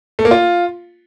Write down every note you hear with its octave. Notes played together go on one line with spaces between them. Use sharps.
A3
A#3
F4